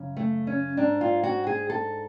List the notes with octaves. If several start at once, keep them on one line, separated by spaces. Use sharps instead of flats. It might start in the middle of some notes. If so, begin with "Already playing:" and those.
Already playing: F#2 C#3
A3
C#4
G#2 D4
F4
F#4
G#4
A4